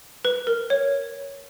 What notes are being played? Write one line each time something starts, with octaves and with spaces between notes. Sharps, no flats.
B4
A#4
C#5